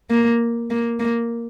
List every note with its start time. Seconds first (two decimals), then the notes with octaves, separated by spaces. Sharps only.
0.10 A#3
0.70 A#3
1.00 A#3